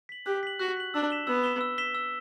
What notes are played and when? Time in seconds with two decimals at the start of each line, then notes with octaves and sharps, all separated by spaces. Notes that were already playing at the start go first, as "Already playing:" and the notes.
0.09 B6 F#7
0.26 G4 F#6
0.43 B6 F#7
0.60 F#4 F#6
0.77 B6 F#7
0.94 D4 E6
1.10 B6 E7 G7
1.27 B3 E6
1.44 B6 E7 G7
1.61 E6
1.78 B6 E7 G7
1.95 E6